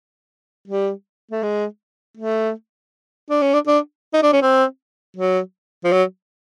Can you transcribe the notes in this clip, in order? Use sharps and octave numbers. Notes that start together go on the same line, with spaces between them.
G3
A3
G#3
A3
D4
C#4
D4
D4
D#4
D4
C#4
C4
F#3
F3
F#3